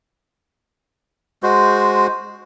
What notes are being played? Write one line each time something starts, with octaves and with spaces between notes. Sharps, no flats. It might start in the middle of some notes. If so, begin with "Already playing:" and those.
G#3 F#4 C5